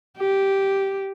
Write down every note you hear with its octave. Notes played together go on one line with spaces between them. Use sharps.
G4